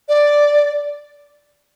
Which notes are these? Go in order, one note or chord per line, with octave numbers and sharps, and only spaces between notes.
D5